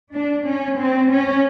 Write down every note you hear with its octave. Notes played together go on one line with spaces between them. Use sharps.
D4
C#4
C4
C#4